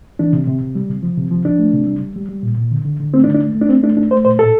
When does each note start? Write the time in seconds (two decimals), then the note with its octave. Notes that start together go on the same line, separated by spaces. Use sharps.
0.19 E3 D4
0.33 C3
0.47 C3
0.62 C3
0.75 G3
0.90 C3
1.03 F3
1.18 C3
1.31 F3
1.45 F3 D4
1.59 A3
1.73 C3
1.87 G3
2.02 G3
2.16 G3
2.29 G3
2.43 A#2
2.57 A#2
2.71 D3
2.85 D3
3.00 D3
3.14 A3 C4
3.24 D4
3.27 D3
3.34 D4
3.42 A3
3.55 A3
3.61 D4
3.69 A3 C4
3.83 A3 D4
3.97 A3 D4
4.11 A3 C5
4.25 A#2 C5
4.39 A2 A4